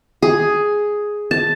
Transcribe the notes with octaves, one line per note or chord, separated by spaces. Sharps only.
G#4
A5